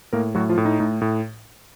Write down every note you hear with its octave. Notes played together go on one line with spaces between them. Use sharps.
A2 A#3 A#4
A2 F#3 F#4
F3 F4
A2
D#4
A2
A2